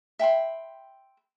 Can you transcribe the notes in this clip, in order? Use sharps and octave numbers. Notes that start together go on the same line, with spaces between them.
E5 G5 B5 C6